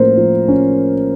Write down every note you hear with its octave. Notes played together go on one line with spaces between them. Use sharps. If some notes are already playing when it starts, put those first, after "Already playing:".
Already playing: A2 F3 A#3 C#4 A#4 C5
F3
C#4